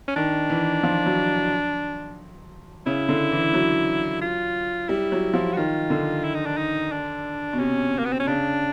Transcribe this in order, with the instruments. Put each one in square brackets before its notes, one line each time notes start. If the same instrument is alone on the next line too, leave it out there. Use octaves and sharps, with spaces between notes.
[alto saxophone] C#4
[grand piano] D#3 [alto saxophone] D4
[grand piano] E3
F3
F#3
[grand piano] C#3 [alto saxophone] E4
[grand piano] D3
E3
F#3
[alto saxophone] F4
[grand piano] G3 [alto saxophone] E4
[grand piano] F#3
F3
[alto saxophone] F#4
[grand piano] D#3 [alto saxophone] F4
[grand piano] D3
[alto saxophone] E4
D#4
D4
D#4
D4
[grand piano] B2
[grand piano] C3 [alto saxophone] C#4
[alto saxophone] A#3
B3
C4
C#4
[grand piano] C#3 [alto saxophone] D4